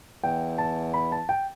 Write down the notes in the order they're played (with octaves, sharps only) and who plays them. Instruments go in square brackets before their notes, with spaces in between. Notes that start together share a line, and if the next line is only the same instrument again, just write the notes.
[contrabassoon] E2 [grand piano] G5
[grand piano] A5
B5
A5
G5